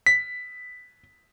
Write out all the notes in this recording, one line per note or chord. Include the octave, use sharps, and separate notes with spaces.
B6